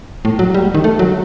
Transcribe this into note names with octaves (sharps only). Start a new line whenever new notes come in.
A2
F#3
G3
D#3
A3
F#3